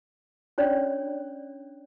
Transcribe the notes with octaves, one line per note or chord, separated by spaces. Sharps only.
C#4 D4 C#5 D5